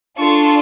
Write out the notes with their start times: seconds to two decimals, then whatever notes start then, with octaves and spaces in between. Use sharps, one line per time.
0.17 D4 F4 A4 C#6